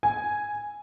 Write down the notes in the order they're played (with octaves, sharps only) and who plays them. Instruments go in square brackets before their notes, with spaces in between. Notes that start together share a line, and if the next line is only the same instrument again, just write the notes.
[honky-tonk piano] G#5